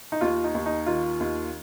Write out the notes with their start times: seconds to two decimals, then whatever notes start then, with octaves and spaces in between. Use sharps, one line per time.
0.12 D#4
0.21 D#2 F4
0.44 D#4
0.55 D#2
0.66 D#4
0.86 D#3 F4
1.20 D#2